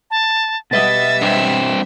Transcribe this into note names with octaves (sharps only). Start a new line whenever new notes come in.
A5
B2 G3 B4 D#5 E5 F#5 A6
G2 C4 E7